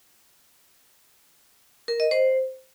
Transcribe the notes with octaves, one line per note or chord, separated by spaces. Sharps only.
A#4
D#5
C5